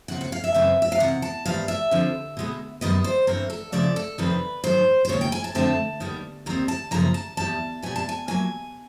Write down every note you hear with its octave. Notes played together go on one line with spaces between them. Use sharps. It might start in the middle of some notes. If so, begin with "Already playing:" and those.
D#2 C#3 C4 F#5
F#5
F5
E5
F#2 C#3 E3 G3 C4
E5
F5
E2 C3 F#5
A5
G#2 E3 G3 B3 F5
E5
F2 D3 F3
B2 G#3 B3
F#2 D#3 G3 B3 D#5
C5
G2 E3 A3 C4 A#4
A4
D#2 C#3 F3 A3 D5
A4
F2 C3 D#3 G3 C4 B4
G#2 D#3 F#3 C5
C5
D#2 C#3 F#3 A#3 C#5
G5
G#5
A5
F2 D3 F3 A3 C4 A5
D#2 D#3 G3 B3
D#2 D#3 G3 C4 A#5
A5
F#2 C#3 F3 A#3 A#5
A5
E2 B2 G3 A5
B2 G3 B3 G#5
A5
G#5
A#2 F#3 A#3 G#5